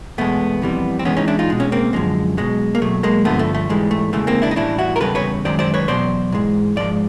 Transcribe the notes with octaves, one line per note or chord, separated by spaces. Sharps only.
E2 B2 G#3 A3 B3
F2 C3 E3 G3
C4
G#2 E3 G#3 B3 C#4
C#4 D#4
D4 E4
D#4 F4
B2 G#3
C#4
A#3 C4
F#2 D3 F3 G#3
B2 F#3 G#3
A#3
B2 F#3 A3
G#3 A#3
G2 D3 F3 A3 B3
A3
A3
G#2 E3 G3 G#3
A3
E2 C#3 E3 G#3 A3
A#3 C4
D4 E4
D#4
A2 E3 G3 D4 E4
E4 F#4
A#4
E2 C#3 E3 G3 A4 B4
B4 C#5
F#2 D#3 G#3 C5 D5
C5 D5
B4 C#5
E2 B2 F#3 C5 D5
G#2 E3 G#3
G#2 F3 G#3 D5